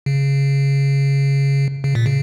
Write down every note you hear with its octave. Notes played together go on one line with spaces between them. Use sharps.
C#3
C#3
A#2
C#3